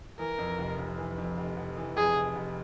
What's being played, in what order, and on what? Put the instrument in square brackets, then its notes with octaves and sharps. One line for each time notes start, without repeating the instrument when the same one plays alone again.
[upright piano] E3 [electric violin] A#4
[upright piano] F2
F1
F1
E3
F2
F1
F1
E3
[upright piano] F2 [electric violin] G#4
[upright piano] F1
F1